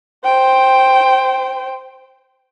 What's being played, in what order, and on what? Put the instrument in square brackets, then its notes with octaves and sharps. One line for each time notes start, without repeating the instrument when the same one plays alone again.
[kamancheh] C5 G5